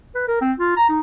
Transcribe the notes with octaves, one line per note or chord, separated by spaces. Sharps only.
B4
A#4
C4
F4
A#5
D#4